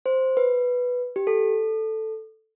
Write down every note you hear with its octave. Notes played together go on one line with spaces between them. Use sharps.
C5
B4
G4
A4